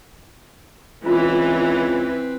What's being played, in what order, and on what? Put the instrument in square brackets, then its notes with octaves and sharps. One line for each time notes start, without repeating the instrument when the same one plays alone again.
[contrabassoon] C#2 [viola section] E3 [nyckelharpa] C4 B4 [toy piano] F4